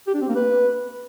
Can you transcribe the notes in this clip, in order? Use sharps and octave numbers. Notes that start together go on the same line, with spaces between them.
G4
D4
C4
A#3
B4